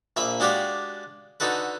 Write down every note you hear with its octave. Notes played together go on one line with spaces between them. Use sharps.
A#1 A#3 E5 B5
G#3 D4 F#4 G4 D5 F5
D3 D#4 F#4 A4 B4